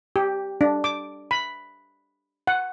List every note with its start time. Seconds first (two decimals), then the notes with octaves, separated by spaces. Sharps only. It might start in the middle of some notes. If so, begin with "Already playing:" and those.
0.16 G4
0.61 D4
0.84 D6
1.31 B5
2.47 F#5